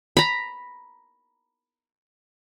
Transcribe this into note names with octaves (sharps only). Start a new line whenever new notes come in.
A#5 B5